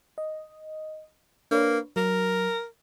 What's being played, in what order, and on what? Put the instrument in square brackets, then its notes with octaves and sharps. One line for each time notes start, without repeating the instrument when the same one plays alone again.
[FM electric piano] D#5
[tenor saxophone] A#3 [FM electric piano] D4 B4 C#5
[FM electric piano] F#3 [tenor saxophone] A#4